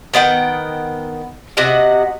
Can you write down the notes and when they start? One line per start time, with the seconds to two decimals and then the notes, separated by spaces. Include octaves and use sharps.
0.14 D#3 B3 F#5 G5
1.57 C3 F#4 D#5 F#5